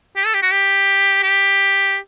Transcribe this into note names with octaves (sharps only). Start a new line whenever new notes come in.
G4
A4
G4
F#4
G4
G4